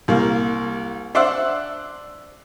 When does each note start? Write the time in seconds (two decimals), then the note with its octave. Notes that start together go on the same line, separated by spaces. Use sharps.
0.08 C2 A#3
1.15 D4 C5 D5 E5 F#5